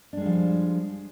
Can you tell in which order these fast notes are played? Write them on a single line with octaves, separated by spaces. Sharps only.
D4 G#3 G3 F3